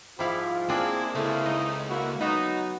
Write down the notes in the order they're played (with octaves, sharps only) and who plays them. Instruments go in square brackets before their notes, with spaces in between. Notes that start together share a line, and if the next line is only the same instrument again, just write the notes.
[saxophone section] G#2 F3 [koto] G3 E4 F5 [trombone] F4
[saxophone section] G#3 A#3 [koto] C4 D4 G#4 [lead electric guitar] E4
[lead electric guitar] C#2 [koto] A3 [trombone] E4
[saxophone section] D#4 [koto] D#5
[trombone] A#3 [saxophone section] E4 F#4
[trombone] F#3 [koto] B3 F#4 [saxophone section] D#4